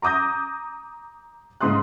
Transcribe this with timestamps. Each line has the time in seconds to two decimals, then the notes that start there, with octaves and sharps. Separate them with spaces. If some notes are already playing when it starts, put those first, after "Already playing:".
0.02 A#5 D6 D#6 G6 A#6
1.61 G#2 C#3 C6 D#6 F#6